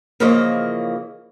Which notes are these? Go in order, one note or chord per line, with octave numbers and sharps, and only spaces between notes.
C#3 E3 F3 A#3 C#5 D#5